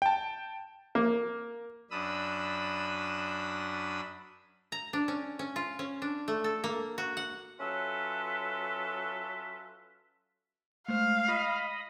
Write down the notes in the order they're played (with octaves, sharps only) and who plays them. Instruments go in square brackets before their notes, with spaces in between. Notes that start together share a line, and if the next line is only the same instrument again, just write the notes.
[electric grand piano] G5 A5
[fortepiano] A#3
[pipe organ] F#2 D4 B5 D#6 E6
[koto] A#5
D4
C#4
C#4
F4
C#4
D4
A3
A4
A#3
F#4
F#5
[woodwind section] F#3 C#4 F4 A4 B4 E5
[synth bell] G#3 A3 C5 [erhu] F5
[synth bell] F4 C#6 [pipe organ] D#5 B5 D#6